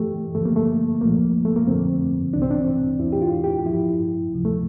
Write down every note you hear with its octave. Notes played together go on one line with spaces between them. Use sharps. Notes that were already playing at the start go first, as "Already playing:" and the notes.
Already playing: G2 E3 A3 G4
G2 D3 F3 A3
A#3
A3
C2 A#2 F3 A#3
A3
A#3
F2 D3 F3 C4
C2 C3 E3 D4
C4
D4
E2 E3 E4
G4
F4
G4
G2 F3 E4
D2 C3 F3
A3